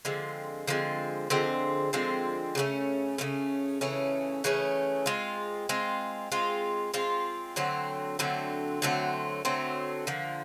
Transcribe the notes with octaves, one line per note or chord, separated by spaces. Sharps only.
D3 F3 G#3 C4
D3 F3 G#3 C4
D3 F3 G#3 C4
D3 F3 G#3 C4
C#3 E3 A3 C#4
C#3 E3 A3 C#4
C#3 E3 A3 C#4
C#3 E3 A3 C#4
G#3 C4 F4
G#3 C4 F4
G#3 C4 F4
G#3 C4 F4
D3 F#3 A3 C4
D3 F#3 A3 C4
D3 F#3 A3 C4
D3 F#3 A3 C4
D3 F3 A#3